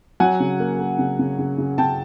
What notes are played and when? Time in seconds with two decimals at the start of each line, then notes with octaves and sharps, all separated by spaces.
0.20 F#3 F#5 G#5
0.40 C#3
0.60 A#3
0.79 A#3
0.99 C#3
1.19 C#3
1.39 C#3
1.58 C#3
1.78 C#3 G5 A5